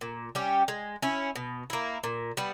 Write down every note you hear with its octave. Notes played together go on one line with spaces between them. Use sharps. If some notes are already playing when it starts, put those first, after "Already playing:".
A#2
G3 C#4 G4
G#3
C#4 E4
B2
A#3 E4
A#2
G3 B3